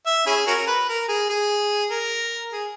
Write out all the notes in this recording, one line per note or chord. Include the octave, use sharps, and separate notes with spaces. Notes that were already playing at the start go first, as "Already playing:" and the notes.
E5
C#4 E4 G#4
C#4 F#4 A#4
B4
A#4
G#4
G#4
A#4
G#4